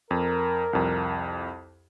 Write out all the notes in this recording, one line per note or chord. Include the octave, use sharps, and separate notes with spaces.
F2 A#4
C2 F2